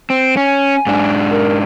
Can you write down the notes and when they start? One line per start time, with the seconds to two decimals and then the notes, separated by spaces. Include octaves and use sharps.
0.10 C4
0.37 C#4 G#5
0.86 G#2 D4
1.30 A#4